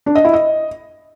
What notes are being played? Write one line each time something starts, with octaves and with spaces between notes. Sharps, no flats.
D4
D#5
E4
D#5